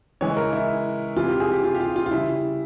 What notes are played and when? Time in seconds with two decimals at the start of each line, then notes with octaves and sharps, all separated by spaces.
0.21 C#3 E3 G#3 C#5
0.37 A#4
0.53 E4
1.16 C3 E3 G3 F4
1.28 G4
1.40 G#4
1.52 G4
1.64 F4
1.75 G4
1.80 F4
1.96 F4
2.06 F4
2.11 C#3 G3 E4